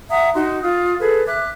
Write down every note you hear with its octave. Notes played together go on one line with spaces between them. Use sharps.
E5 F#5 A#5 D#6
D#4 F#4 C6
F4 D#6
G#4 A4 B4
E5 D6 F#6